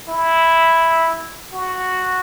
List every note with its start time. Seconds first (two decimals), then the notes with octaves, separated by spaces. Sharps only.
0.09 E4
1.53 F#4